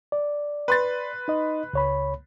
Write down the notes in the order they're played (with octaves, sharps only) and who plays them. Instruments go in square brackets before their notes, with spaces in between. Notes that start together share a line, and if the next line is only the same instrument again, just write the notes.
[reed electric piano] D5
[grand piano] B4 C6 A6
[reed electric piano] D#4 D#5
C#2 C#5 B5